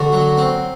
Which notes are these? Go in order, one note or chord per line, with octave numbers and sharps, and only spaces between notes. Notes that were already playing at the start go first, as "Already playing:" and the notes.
Already playing: D3 F#4
F#3
C4